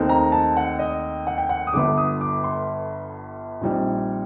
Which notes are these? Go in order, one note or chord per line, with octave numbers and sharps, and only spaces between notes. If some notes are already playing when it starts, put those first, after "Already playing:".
Already playing: D#2 D#3 A3 C4 D#4
A#5
A5
F#5
D#5
F#5
G5
F#5
D#6
G1 G2 D3 D6
D#6
D6
C6
A#1 A#2 G3 C4 D#4